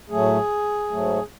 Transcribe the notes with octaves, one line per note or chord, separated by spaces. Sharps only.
A2 F#3 A3 G#4
G#2 F#3 A3